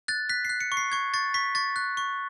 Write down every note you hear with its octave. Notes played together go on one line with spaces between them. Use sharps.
F#6 A6
F#6 B6
F#6 C7
C#7
C#6
C7
C#6 G#6
C#6 A6
C#6 B6
C#6 A6
F#6
C#6